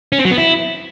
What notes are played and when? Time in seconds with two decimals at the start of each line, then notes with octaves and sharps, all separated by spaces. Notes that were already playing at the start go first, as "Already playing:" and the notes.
0.12 C#4
0.19 C4
0.25 F#3
0.31 B3
0.38 E4